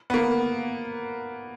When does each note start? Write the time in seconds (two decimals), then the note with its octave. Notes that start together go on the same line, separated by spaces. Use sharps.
0.10 B3
0.14 A#3